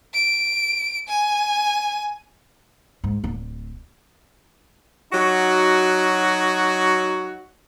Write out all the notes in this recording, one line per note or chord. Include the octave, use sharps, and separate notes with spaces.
D7
G#5
G#2
D1
F#3 D#4 F#4